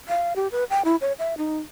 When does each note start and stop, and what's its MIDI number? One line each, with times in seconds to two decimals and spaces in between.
0.09 0.33 77
0.36 0.48 67
0.52 0.64 71
0.70 0.82 79
0.85 0.96 64
1.01 1.12 73
1.19 1.34 76
1.38 1.58 63